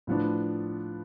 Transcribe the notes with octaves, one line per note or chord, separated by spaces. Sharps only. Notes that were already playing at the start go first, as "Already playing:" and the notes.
A2 F3 B3 D4